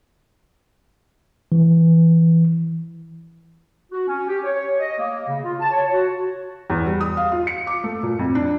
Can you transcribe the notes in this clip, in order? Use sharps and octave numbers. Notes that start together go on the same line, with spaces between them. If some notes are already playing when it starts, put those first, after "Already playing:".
E3
F#4
C#4
G4
C#5
D#5
A#3
C#3
F4
A5
C#5
F#4
E2
G3
D#6
F5
F4
C#7
D6
A3
A#2
F2
D4